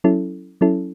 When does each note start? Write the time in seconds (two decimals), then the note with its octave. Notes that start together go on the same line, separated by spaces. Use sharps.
0.04 F#3 C#4 E4 A4
0.61 F#3 C#4 E4 A4